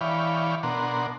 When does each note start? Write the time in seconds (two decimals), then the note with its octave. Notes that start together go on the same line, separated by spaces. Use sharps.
0.01 E3 C#5 D5 F5 G5 B5
0.63 B2 D4 A#4 F#5 C6